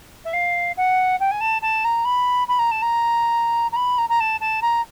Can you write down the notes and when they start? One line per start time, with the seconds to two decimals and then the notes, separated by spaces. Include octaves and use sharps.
0.24 E5
0.33 F5
0.77 F#5
1.20 G5
1.31 G#5
1.40 A5
1.61 A5
1.84 A#5
2.05 B5
2.48 B5
2.59 A#5
2.71 A5
2.82 A#5
3.72 A#5
3.76 B5
3.98 A#5
4.09 A#5
4.20 A5
4.40 A5
4.62 A#5